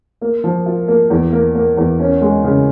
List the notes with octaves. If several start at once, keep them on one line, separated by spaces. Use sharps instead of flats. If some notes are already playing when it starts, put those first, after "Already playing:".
A#3
F3
F4
A#3
E2
A#3
A#3
E2
C#4
G#3
C#3